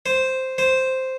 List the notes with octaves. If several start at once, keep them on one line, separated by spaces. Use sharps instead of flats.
C5
C5